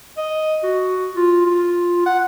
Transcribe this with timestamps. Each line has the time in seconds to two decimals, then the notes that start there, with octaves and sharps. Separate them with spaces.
0.17 D#5
0.63 F#4
1.16 F4
1.46 F4
2.06 F#5